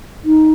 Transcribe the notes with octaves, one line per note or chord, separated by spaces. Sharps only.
D#4